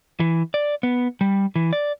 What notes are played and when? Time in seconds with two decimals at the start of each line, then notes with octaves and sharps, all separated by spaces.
0.20 E3
0.54 D5
0.83 B3
1.21 G3
1.56 E3
1.73 D5